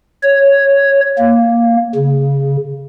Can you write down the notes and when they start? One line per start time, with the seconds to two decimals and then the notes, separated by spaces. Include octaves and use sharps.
0.23 C#5
1.18 A#3
1.95 C#3